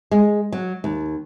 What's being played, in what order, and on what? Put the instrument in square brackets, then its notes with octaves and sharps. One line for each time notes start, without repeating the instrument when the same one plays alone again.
[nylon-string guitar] G#3
F#3
D#2